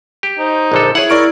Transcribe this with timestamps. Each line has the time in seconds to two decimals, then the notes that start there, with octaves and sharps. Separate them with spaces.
0.23 G4
0.39 D#4 C5
0.72 A#1 D3 A4
0.95 E4 G#4 C#5 F#5
1.10 E4 A#4 D5 C#6 D7